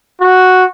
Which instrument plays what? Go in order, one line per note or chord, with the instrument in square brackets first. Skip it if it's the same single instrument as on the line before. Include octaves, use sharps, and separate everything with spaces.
[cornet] F#4